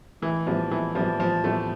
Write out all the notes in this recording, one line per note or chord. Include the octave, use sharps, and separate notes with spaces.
A1 E3
A2 F3 G3 B3 E4
A1 E3
A2 F3 G3 B3 E4
A1 F3
A2 G3 A3 B3 E4